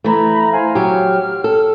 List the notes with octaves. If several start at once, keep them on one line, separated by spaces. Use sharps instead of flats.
E3 A3 A#5 B5
C5 F5 G#5
F#3 G4 F6
A4